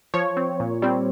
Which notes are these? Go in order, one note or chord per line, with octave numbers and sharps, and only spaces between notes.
F3 C#5
C4
A#2
G3 C4